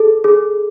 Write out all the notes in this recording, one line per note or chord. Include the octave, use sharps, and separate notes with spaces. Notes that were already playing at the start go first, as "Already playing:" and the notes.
Already playing: G#4 A4
G#4